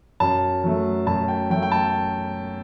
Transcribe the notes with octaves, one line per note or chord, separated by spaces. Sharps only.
F#2 A5
F#3 A3
F#2 A5
G5
F#3 A3 G5
G5
A5